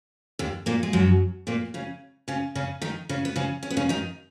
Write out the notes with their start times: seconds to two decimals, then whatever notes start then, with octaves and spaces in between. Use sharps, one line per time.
0.39 D#2 D#3
0.66 A#2 A#3
0.83 G#3
0.93 F#2 F#3
1.47 A#2 A#3
1.74 C#3 C#4
2.28 C#3 C#4
2.55 C#3 C#4
2.82 D#3 D#4
3.09 C#3 C#4
3.25 B3
3.36 C#3 C#4
3.63 C#4
3.70 B3
3.77 C#3 C#4
3.89 D#3 D#4